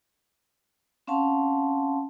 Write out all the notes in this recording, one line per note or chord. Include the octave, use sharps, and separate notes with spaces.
C4 C#4 F5 F#5 A5 C6